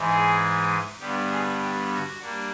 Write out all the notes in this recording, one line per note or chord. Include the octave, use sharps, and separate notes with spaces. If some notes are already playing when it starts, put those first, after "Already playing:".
Already playing: G#2 E3 G#3
G#4
G2 D3 G3 B3 G4
G#4
G4
F#4
G3 A#3 D4